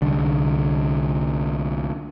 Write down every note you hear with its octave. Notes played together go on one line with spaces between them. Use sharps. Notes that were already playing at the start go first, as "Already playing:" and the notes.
C2 D3